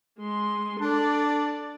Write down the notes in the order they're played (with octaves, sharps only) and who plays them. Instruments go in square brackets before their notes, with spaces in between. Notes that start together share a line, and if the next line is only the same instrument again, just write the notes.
[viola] G#3 C6
[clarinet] D4 [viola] A4 D5